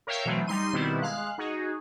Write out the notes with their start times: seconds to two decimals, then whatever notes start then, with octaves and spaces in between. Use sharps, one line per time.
0.07 A#4 C#5 E5 F5 G5
0.25 B2 E3 F#3 A3 C4
0.47 G3 D#4 C6 D#7
0.73 B2 D#3 G3 B3 C4 E4
1.02 G#3 F5 F#6
1.38 D#4 F#4 G#4